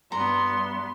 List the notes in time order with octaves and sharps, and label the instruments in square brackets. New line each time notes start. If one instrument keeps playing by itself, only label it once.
[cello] G2 B3 [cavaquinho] A#5 [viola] C6